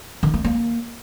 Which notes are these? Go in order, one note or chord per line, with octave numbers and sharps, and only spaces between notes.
D#3
A#3
A#3